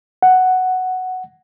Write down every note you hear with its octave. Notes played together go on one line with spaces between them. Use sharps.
F#5